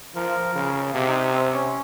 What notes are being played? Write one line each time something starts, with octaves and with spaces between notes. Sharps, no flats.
F3 A#4
C#3
C3 G4
D#4
C4
C#4